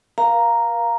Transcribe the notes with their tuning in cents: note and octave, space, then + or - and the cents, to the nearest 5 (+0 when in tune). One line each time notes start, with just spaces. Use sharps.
A#4 +40 F5 +0 A#5 +0